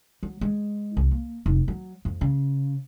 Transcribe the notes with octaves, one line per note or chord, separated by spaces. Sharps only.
F#3
G#3
C2
A#3
F1
F#3
F2
C#3